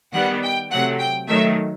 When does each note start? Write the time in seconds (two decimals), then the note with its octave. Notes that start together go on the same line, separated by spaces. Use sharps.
0.13 D#3 G3 B3 F#5
0.43 G5
0.71 C3 F#3 A3 F#5
0.99 G5
1.28 D#3 F#3 A3 E5